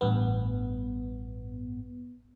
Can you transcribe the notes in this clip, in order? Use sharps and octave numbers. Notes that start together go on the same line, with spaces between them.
A1 G2 B3